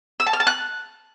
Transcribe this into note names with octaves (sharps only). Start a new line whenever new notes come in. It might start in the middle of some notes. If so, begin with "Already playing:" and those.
E6
A5
F6
A5
F#6